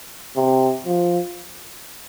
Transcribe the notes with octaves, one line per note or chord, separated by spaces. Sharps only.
C3
F3